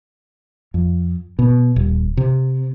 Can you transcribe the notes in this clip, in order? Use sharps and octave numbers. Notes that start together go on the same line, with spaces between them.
F2
B2
D#1
C3